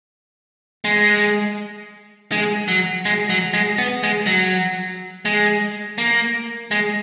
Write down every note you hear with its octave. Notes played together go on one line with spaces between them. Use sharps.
G#3
G#3
F#3
G#3
F#3
G#3
B3
G#3
F#3
G#3
A#3
G#3